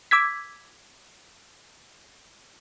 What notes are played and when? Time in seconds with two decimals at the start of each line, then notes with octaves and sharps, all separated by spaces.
0.11 D6 E6 G#6 B6